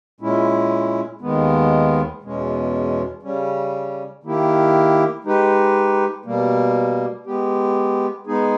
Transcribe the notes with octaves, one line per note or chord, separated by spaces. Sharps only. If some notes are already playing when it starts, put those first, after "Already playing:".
A#2 G#3 C#4 E4
D#2 D#3 G#3 B3
E2 B2 G#3 C#4
C#3 G3 C#4
D#3 A#3 E4 G4
G#3 D#4 G4 B4
B2 G3 A#3
G#3 B3 G4
G#3 B3 D#4 G#4